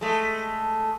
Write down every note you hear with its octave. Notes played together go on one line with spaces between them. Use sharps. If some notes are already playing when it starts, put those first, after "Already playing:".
G#3 A3